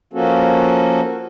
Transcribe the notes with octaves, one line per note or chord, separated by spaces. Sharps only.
F3 A#3 C#4 F#4 A4